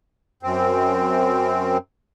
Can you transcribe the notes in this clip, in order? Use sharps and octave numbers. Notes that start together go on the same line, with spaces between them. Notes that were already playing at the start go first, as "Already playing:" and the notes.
F#2 C4